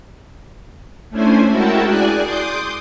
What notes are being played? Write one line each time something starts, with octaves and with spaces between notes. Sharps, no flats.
A3 C#4 D4 E4 C5 G#5
G#3 E4 F#4 A#4 G5 A5
G#4 D5 G#5 F#6
C6 D6 D#6 G6